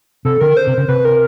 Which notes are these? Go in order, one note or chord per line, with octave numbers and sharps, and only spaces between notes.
C3 A4
D3 A#4
C5
C3
C#3
C3 B4
A#4